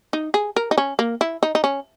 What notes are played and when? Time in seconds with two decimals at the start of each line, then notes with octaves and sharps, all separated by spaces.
0.13 D#4
0.34 G#4
0.56 A#4
0.71 D#4
0.78 C#4
0.99 A#3
1.21 E4
1.43 D#4
1.55 D#4
1.64 C#4